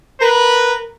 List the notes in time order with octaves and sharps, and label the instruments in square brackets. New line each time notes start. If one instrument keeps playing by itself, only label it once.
[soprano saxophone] A#4 [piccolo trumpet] B4